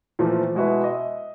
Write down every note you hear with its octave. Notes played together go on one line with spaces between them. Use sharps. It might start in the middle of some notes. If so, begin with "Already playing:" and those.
A#2 E3 F3 A3
B2 G#3 E4 F#4 G#4 B4
D#5 E5